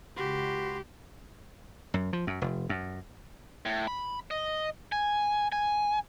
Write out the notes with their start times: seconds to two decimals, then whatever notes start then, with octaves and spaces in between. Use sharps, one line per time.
0.17 C#2 F#4 G4 B5 C6
1.94 F#2
2.13 F3
2.27 F#2
2.41 F1
2.69 F#2
3.65 A2
3.87 B5
4.31 D#5
4.92 G#5
5.52 G#5